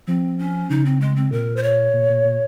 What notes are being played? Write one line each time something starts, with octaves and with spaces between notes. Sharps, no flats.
F3 C4
C#4
C#3 D#4
C4
G#3
C4
A#2 A#4
C5
C#5
A#2
A#2
A#2